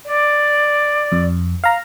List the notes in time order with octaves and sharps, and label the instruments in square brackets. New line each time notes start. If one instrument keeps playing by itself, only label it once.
[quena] D5
[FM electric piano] F2
F5 A#5